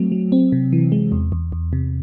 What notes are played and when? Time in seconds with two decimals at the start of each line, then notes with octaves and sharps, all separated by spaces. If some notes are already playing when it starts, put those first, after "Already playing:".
Already playing: F#3 A3 C4
0.12 F#3
0.32 C4
0.52 C3
0.73 E3
0.92 G#3
1.12 E2
1.32 E2
1.52 E2
1.73 C3